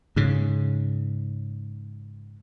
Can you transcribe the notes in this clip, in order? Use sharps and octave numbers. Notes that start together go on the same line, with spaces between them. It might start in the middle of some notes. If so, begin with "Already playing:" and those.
G#2 C#3